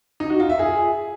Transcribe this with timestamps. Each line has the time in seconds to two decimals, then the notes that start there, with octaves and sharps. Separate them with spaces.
0.20 D#4
0.30 F#4
0.40 F4
0.50 E5
0.59 G#4